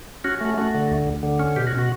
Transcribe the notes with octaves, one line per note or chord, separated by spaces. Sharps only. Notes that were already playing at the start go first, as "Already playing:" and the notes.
C#4 F#4
A3 F#4
A3 F#4
D3
D2
D2
D3
C#4
B2 G4
F#4
B2
F#4